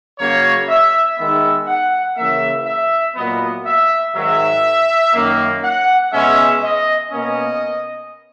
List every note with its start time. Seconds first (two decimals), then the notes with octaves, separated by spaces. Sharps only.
0.18 C#3 F#3 A#3 C#5
0.68 E5
1.17 D#3 G#3 B3 E5
1.67 F#5
2.17 C#3 E3 A#3 E5
2.66 E5
3.16 A#2 F#3 B3 D#5
3.65 E5
4.14 G#2 D#3 F#3 E5
5.13 F#2 D#3 A#3
5.63 F#5
6.13 B2 G#3 C#4 E5
6.62 D#5
7.12 B2 A#3 C#4 D#5